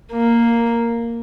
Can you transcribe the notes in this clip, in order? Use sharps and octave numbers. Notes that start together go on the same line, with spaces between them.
A#3